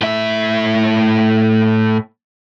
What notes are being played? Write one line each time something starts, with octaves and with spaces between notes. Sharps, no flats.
A2 E5